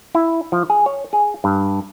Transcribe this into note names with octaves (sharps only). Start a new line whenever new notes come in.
E4
F3
G#4
C#5
G#4
G2